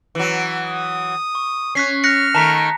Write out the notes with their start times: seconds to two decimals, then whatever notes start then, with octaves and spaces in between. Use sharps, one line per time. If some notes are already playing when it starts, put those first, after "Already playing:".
0.15 E3 F#3
0.66 D#6
1.35 C#6
1.75 C#4 C#5 F#6 B6 C7
2.04 F6 F#6 A#6 C#7
2.35 D#3 A3 A5 A#5 B6